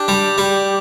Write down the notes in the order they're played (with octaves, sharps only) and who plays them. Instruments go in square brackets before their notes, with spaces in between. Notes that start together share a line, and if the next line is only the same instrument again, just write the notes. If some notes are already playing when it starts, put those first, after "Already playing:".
Already playing: [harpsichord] D4 [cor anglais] G4
[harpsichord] G3
G3